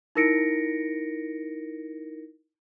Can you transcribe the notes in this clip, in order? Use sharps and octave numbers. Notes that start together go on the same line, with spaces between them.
D#4 E4 A#4 A#6 C#7 D7